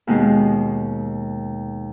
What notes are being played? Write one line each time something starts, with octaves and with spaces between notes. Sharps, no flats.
D#2 B2 G#3